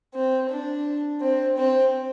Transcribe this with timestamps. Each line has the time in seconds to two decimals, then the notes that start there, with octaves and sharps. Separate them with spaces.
0.14 C4
0.50 D4
1.21 C4
1.56 C4